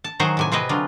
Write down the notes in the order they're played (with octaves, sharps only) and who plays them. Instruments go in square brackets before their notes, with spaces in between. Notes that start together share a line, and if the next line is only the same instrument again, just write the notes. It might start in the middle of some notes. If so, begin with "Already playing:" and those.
[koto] A5
D#3 F#3 F#4 G#4 C5
A2 C3 G#5
C3 C4 G#4 B4 D#5
D3 F#3 F4